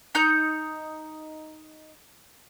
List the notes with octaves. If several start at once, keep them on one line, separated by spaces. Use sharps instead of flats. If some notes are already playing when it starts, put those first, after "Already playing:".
D#4 A#5 G6